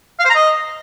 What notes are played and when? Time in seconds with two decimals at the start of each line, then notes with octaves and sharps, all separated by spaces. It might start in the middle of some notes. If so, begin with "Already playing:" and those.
0.19 F5
0.25 C5
0.30 A#5
0.35 D#5